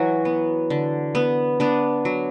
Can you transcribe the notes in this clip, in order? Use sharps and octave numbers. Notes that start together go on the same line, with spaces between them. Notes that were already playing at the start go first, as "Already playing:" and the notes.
Already playing: E3 F#3 F#4
B3
D3
B3
B3 D4
F#3